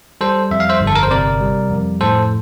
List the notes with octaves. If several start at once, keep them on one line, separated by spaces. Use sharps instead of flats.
G3 A4 C5
F2 E5
F5
C5 E5
G1
A4
A#4
C5
C3 A#4 D5
G3
F2
A2 A4 C5